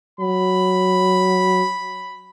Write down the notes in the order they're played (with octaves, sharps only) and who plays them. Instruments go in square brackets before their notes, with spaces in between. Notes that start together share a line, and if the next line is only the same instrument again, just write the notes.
[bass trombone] F#3 [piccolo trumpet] B5